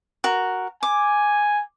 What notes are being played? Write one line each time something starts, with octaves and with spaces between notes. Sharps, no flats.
F#4 A#4
G#5 D6